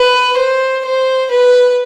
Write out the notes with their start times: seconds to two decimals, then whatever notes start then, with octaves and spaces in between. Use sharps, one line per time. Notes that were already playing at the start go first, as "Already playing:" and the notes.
Already playing: B4
0.37 C5
0.85 C5
1.31 B4